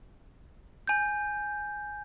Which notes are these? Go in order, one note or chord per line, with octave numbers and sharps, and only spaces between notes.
G#5 G6